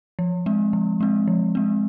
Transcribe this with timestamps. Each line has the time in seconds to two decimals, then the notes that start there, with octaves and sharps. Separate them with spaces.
0.19 F3
0.46 G#3 C4
0.73 F3
1.01 G#3 C4
1.28 F3
1.55 G#3 C4